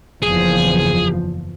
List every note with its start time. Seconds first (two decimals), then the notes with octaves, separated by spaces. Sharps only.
0.22 F#1 E2 F3 G#4